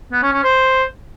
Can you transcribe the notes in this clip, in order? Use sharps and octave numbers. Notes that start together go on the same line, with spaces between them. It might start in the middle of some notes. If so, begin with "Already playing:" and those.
B3
C#4
C#4
C5